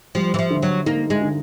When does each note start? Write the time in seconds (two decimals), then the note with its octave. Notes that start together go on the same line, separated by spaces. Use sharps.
0.15 F3 G3
0.34 E3
0.39 F3
0.50 D3
0.63 F#3
0.86 A#3 D#4
1.10 G#3
1.22 D3